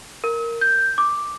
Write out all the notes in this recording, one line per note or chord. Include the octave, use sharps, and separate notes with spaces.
A#4
G6
D6